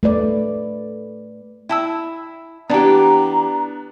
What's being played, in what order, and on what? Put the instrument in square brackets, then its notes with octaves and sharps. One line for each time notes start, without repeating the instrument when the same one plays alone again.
[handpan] A3 B4 D5
[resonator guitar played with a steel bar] E4 [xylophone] G5 A5 E6
[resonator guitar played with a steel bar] E3 G4 [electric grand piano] B3 D4 [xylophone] D5 A5 [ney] A#5